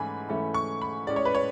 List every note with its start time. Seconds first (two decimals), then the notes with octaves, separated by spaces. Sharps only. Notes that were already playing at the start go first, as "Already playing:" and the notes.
Already playing: G#2 E3 A3 C#4 G#5 B5
0.29 G#2 E3 A3 C#4
0.54 C#6
0.82 B5
1.07 A2 G#3 C#4 D5
1.16 C#5
1.25 B4
1.35 C#5